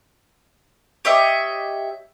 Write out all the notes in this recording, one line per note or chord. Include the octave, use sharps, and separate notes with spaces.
G4 C#5 D#5 E5